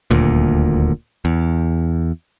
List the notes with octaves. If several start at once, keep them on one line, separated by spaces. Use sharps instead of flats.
D#1 D2 A#2
E2